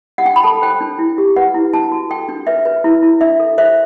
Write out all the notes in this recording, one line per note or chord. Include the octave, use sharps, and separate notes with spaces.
F#5
D4 G5
B5
A4 A5
C5 G5
D4
E4
G4
B4 F#5
E4
D4 A5
F#4
A4 G5
D4
B4 E5
B4
E4
E4
D4 E5
A4
C5 E5